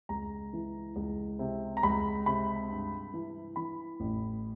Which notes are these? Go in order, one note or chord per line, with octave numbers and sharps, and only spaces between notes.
C#2 A#5
E3
C#2
C3
A#5
C#2 B5
C3 B5
G2
E3
E3 B5
A1